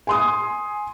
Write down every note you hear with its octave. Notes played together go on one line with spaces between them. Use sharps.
G#5 C6 D#6